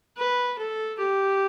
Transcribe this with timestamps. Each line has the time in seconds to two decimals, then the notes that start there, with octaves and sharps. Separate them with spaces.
0.17 B4
0.58 A4
0.98 G4